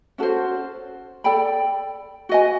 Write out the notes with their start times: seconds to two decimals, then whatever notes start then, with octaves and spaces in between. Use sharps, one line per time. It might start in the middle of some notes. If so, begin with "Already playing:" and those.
0.18 C#4 F#4 A4 C5
1.24 A4 D5 G5 B5
2.29 F#4 B4 D#5 G#5